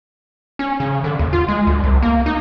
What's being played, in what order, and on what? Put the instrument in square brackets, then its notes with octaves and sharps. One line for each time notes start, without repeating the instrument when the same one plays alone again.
[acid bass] C#4
C#3
D3
D#2
F4
G#3
D2
C2
A#3
D#4